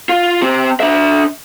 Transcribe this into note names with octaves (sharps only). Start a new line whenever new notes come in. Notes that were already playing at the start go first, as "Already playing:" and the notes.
F4
C4 G4
D4 E5